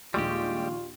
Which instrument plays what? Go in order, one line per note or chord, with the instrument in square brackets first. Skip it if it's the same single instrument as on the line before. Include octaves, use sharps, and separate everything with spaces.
[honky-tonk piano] A#1 D#2 C#6 [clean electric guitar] G3 G#3 G4 [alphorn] F4